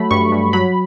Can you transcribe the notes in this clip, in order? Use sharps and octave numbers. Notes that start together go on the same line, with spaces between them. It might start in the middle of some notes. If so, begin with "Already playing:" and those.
Already playing: F#3 A3 B5
G2 C#6
G2
F#3 B5